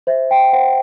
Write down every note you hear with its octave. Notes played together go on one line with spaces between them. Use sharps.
C5 E5
G5
C5 F#5